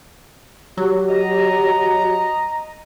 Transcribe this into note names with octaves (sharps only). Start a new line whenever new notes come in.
F#3 G4
D#5 A#5